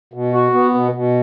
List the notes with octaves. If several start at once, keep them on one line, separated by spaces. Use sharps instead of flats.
B2
F#4
B3
B2
B2